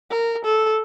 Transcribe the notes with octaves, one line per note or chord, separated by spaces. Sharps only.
A#4
A4